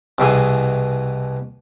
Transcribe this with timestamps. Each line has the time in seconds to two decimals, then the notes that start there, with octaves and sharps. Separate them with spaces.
0.18 C2 B2 E3 G#4